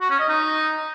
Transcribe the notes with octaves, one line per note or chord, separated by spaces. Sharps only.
F#4
C#4
D#5
D#4